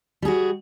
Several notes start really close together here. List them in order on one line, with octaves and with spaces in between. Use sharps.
G3 G#4 F#4